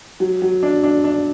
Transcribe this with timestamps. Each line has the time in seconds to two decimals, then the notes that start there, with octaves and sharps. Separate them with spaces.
0.20 F#3
0.42 F#3
0.63 D4
0.83 D4
1.04 D4